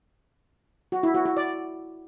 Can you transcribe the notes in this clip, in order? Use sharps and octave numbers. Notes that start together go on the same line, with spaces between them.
F#4
E4
F#4
F#4
D5